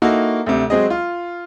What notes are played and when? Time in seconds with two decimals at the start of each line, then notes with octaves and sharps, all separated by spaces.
0.02 A#3 D#4 E4 F#4 A4
0.46 D2 C3
0.70 F#3 G#3 C4 G#4 D#5
0.90 F4